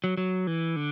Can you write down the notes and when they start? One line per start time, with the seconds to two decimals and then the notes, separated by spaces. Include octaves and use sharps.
0.04 F#3
0.17 F#3
0.47 E3
0.76 D3